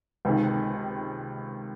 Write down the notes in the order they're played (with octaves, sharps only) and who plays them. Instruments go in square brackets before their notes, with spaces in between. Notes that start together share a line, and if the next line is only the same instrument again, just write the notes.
[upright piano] C#2 C3 D#3